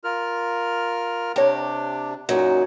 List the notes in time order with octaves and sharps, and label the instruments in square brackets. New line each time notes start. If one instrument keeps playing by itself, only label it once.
[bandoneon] F4 A#4 F6
[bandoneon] C3 D4 [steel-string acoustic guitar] G4 [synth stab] C#5 A#5
[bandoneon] F#2 A#2 D#4 [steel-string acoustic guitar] F#3